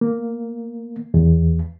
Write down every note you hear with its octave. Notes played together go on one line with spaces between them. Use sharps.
A#3
E2